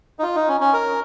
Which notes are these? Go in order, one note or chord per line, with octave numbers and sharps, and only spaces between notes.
D#4
F4
D#4
C#4
C#4
A#4